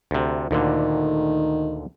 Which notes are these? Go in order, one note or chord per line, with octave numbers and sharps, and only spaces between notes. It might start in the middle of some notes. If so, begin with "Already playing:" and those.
D2 C3
D2 A#2 D3 D#3